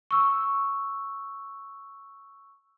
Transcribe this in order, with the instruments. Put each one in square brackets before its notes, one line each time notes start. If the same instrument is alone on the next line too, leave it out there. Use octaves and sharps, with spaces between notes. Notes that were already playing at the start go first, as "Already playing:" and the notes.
[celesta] C#6 E6